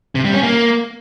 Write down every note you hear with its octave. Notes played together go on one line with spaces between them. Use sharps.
C3
G3
C#4
A#3